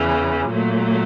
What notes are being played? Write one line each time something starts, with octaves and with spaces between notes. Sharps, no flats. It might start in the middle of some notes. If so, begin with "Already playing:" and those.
Already playing: E2 C#3 E3
A#2 F#3 A3